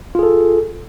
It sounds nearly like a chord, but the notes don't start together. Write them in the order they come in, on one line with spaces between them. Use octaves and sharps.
F4 G#4 A4